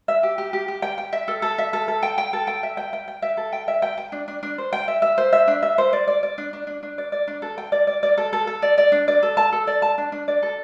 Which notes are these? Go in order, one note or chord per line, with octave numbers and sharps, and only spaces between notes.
E5
G4
G4
G4
G4
G5
G5
E5
A4
A4
E5
A4
A4
G5
G5
A4
G5
E5
G5
G5
G5
E5
A4
G5
E5
G5
G5
D4
D4
D4
C5
G5
E5
E5
C5
E5
D4
E5
C5
D5
D5
D5
D4
D4
D4
D4
D5
D5
D4
A4
G5
D5
D5
D5
A4
A4
A4
D5
D5
D4
D5
A4
A5
A4
D5
A5
D4
D4
D5
A4